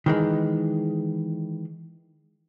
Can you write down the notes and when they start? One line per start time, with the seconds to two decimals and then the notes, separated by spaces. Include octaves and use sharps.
0.06 D#3 E3 G#3